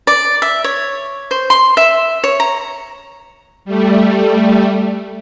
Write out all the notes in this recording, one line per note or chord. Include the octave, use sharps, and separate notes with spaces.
D5
E5
C#5
C5
C6
E5
C#5
A#5
G3 A3